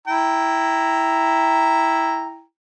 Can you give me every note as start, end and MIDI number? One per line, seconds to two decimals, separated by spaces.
0.08 2.42 64
0.08 2.42 79
0.08 2.42 82